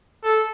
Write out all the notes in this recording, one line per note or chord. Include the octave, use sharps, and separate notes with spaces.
A4